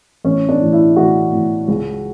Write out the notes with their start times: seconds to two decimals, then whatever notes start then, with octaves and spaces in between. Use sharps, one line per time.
0.24 A1 C#4
0.49 D4
0.61 A2 E3
0.73 E4
0.96 A1 F#4
1.32 A2 E3
1.68 C#2